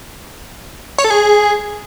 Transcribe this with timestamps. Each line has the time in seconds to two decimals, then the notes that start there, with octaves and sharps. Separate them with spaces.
0.98 C#5
1.04 A4
1.10 G#4